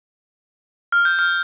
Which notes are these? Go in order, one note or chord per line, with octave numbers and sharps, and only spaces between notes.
F6
G6
F6